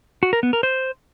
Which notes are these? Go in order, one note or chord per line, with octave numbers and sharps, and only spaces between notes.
F#4
A#4
B3
A#4
C5